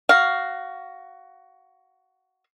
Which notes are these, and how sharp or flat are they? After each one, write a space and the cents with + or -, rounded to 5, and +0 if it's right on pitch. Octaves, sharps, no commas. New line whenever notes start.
F#4 +15 F5 +0